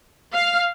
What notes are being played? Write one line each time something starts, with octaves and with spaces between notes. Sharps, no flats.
F5